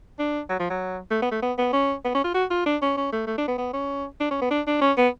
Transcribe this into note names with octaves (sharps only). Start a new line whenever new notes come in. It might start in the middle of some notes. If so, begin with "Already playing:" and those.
D4
F#3
F3
F#3
A3
B3
A3
B3
B3
C#4
B3
C#4
F4
F#4
F4
D4
C#4
C#4
A3
A3
D4
B3
B3
C#4
D4
C#4
B3
D4
D4
C#4
B3